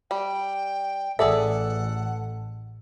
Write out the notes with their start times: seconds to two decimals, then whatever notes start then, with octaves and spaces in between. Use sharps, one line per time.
0.11 G3 G5
1.19 A1 G#4 A4 D5 E5 F#5